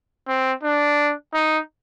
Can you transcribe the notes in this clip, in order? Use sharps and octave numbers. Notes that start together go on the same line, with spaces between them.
C4
D4
D#4